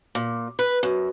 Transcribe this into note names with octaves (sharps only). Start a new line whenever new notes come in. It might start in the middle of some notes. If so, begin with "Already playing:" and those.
A#2
B4
F#2